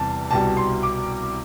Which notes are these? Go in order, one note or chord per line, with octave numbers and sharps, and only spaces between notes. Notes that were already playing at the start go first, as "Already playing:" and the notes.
Already playing: E2 C3 G3 A5
C2 B2 G3 A5
C6
D6